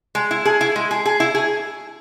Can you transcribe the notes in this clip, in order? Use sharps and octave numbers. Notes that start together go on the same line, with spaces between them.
G#3
E4
G#4
E4
G#3
G#4
G#4
E4
G#4